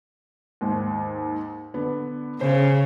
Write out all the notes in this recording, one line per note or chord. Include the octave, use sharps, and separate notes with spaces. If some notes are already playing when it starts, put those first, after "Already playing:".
D#2 G#2
D3 B3
C#3 C5